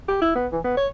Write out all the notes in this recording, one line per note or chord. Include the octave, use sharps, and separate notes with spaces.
G4
E4
B3
E3
B3
C#5